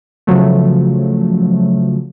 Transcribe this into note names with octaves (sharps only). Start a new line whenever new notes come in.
C#3 F3 F#3 A3